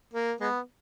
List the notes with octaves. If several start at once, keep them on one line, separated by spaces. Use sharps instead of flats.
A#3
G#3 B3